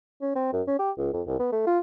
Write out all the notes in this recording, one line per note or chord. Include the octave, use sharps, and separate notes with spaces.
C#4
C4
F#2
C#4
G4
C#2
F2
C2
B3
A3
F4